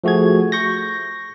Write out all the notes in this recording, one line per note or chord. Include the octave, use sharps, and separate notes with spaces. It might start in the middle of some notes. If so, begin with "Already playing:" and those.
F3 A3 F#4 G#4 G#6
C#6 G6 A#6